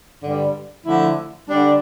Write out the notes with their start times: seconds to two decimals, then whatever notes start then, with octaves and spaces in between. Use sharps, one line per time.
0.22 G2 D3 G3
0.86 D3 F3 A3 E4
1.50 D3 G3 D4